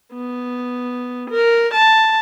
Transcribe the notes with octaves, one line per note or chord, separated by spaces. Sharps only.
B3
A#4
A5